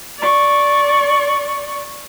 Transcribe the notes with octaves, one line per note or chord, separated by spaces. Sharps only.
D5 C#6